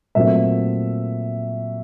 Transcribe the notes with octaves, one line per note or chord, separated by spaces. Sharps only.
A#2 F#3 A3 C4 E5